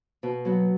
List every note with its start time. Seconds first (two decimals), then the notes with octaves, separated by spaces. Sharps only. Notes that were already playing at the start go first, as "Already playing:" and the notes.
0.23 B2
0.45 F#3 B3